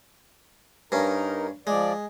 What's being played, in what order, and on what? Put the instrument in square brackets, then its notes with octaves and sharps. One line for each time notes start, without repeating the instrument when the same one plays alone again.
[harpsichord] G2 C#4 [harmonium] D#4 A#4
[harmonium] F3 D5 [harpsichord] G#3